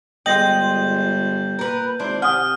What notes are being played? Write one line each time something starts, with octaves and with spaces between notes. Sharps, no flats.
G1 G#3 F4 D#5 G5 G6 A#6 F#7
A#2 A#4 B4
G#1 D4 E4 C5
C3 F#5 G#5 D#6 F6